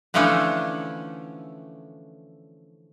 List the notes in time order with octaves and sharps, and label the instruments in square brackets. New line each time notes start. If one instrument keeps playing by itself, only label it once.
[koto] D3 E3 F3 A3 C#4 D4